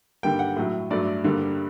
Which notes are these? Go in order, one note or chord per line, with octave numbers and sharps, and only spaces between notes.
G2 D3 G3 A#3 G5
F#5
A2 F#3 A3
G2 F#3 A3 D5
G2 D3 G3 A#3